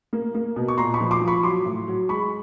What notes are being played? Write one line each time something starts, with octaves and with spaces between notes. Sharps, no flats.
A#3
A#3
B2
C#6
A#2 A#5 C6
B5 C#6
F3
C6 D6
F3
B5 C#6
F#3 C6 D6
A2
F#3
G#3 B5 C#6